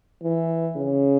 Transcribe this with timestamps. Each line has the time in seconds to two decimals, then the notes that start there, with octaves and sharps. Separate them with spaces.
0.23 E3
0.76 C#3